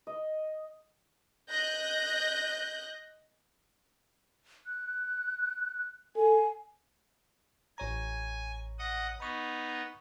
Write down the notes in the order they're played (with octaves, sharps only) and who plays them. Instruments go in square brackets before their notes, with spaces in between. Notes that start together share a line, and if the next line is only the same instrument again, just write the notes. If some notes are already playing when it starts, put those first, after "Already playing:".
[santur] D#5
[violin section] D#5 F#6 G6 A#6
[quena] F#6
[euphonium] A4 [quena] G#5
[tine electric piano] A1 C#5 A#5 [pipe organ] G#5
[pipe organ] D#5 F#5 D#6
[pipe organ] B3 D#4 [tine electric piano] B5 C#6